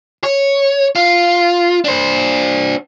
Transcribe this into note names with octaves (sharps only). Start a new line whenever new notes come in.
C#5
F4
D4 C5